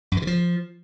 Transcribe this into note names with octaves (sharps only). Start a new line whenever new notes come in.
F#2
E3
C#3
F3